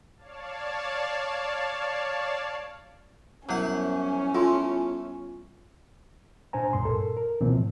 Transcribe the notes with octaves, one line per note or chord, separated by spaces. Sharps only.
C#5 D5 F5 A5
F#2 G3 B3 C#4 E4 F#5
A3 F4 G#5 C6
A#2 D4 C5 G#5 A#5
C#2 G2 A#2 C6
A4 A#4
A#4
D2 B2 E3 F3 A#3 C4
A2